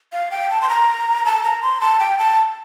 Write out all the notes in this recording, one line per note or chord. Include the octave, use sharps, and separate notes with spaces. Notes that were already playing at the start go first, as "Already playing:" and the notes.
F5
G5
A5
C6
A#5
A5
A#5
C6
A5
G5
A5